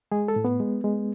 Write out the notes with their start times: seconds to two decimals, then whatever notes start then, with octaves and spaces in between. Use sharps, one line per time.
0.12 G#3 G#4
0.28 A4
0.36 A2
0.45 B3
0.60 G#3
0.84 G#3